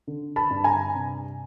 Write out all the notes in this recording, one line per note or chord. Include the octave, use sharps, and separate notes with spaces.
D3
A5 B5
G2
G#5 A#5
C3